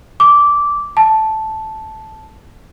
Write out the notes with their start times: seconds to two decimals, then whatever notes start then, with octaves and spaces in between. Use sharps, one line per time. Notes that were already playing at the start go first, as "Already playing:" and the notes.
0.20 D6
0.97 A5